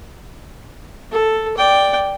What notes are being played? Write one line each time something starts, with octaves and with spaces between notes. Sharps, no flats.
A4
D5 G5